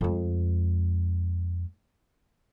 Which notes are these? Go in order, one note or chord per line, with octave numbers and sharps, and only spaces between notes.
F2 G#3